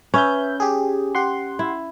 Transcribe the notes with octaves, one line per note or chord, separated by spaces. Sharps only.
C#4 B4 E5 G6
G4 G#4
G4 F#5 C6
E4